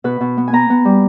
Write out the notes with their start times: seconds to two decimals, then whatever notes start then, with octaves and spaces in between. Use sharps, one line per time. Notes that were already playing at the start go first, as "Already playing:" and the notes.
0.04 B2 B4
0.21 B2
0.37 B3
0.48 G#5
0.53 B3 A#5
0.70 B3
0.85 G3